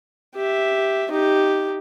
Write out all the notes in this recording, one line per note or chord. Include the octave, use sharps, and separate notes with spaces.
G4 E5
D#4 G4